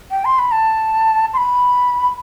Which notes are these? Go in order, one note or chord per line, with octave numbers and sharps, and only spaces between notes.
G5
C6
B5
A5
C6
B5